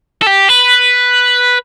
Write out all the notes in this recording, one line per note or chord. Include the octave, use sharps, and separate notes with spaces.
A4
G4
B4